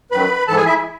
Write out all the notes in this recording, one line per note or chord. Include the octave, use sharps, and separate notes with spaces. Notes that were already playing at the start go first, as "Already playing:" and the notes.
F#2 D#3 F#3 B4 B5
G#2 E3 A4 A5
G#4 G#5
E4 E5